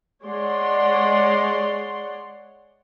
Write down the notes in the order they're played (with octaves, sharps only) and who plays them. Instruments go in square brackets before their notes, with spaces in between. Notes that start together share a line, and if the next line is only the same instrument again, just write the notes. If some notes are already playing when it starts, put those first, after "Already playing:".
[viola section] G#3 C#5 D5 F#5 C6